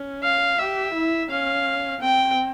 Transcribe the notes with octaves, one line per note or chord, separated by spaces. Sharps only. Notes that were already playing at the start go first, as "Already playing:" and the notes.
Already playing: C#4
F5
G4 E5
E4
C#4 F5
C4 G5